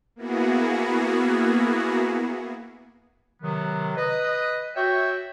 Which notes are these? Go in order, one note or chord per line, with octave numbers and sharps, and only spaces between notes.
A#3 B3 E4 F#4 G#4
C3 D#3 F#3 B3
B4 D#5
F#4 C#5 E5 G5